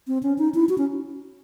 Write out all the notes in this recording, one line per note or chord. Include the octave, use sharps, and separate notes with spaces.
C4
C#4
D#4
E4
F#4
C#4